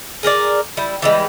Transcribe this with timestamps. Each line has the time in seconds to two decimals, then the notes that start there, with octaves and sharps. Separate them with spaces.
0.23 G#4 A#4 C5 D5
0.77 G3 E4
1.02 E3 G3 G#3